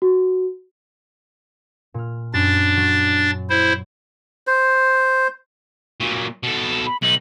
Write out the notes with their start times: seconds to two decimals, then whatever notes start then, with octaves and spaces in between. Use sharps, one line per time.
0.02 F#4
1.94 A#2 F6
2.34 F#2 D4 A6
2.77 F#3
3.50 E4 C5
4.47 C5
6.00 A#2 F#3
6.43 B2 A4
6.86 B5
7.02 B1 D#4 F#7